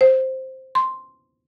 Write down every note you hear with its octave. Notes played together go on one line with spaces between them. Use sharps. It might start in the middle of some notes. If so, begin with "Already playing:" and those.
C5
C6